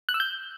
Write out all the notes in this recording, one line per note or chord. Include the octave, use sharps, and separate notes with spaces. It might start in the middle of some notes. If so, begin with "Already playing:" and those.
F#6
E6
G6